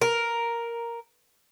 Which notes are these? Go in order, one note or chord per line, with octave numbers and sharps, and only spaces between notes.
A#4